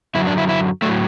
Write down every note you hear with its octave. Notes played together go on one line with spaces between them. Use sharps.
F#2 D3 F#3 E4
D4
E4
E4
A2 F#3 A3